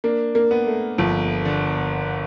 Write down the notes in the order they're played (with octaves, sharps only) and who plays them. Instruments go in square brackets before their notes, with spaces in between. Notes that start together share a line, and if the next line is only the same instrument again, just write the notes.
[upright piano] A#3 [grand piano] D4
[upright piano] A#3
[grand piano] B3
[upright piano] A3
[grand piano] G1 [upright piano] F3
[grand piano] D3